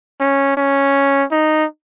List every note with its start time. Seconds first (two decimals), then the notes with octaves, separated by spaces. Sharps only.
0.20 C#4
0.57 C#4
1.32 D#4